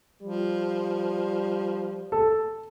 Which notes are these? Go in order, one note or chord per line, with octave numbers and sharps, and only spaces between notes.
F3 G3
A4